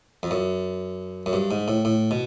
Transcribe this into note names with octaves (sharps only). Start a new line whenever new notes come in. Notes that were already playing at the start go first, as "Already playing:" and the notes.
F2
F#2
F#2
G2
G#2
A2
A2
B2